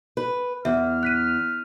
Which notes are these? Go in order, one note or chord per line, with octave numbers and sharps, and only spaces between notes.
B4
E2 E5 F6
F#6 B6 D#7